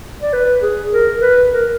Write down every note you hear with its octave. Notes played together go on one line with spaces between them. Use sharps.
D5
B4
G#4
A#4
B4
A#4